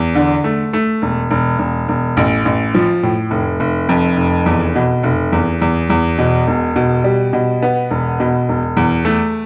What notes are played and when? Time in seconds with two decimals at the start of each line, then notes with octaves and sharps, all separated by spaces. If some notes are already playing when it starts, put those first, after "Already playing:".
Already playing: E2
0.15 D3
0.44 A3
0.73 A3
1.02 E1
1.31 E1
1.59 E1
1.88 E1
2.17 A1
2.45 A1
2.75 F3
3.03 A2
3.31 F1
3.60 F1
3.89 F2
4.17 F1
4.46 E2
4.75 B2
5.03 F1
5.33 E2
5.62 E2
5.90 E2
6.18 B2
6.47 E1
6.76 B2
7.04 G3
7.33 B2
7.62 B3
7.90 E1
8.20 B2
8.49 E1
8.77 E2
9.05 A3